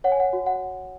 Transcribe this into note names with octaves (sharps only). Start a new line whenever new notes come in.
C#5 F#5
G#5
F#5
F#4
F#5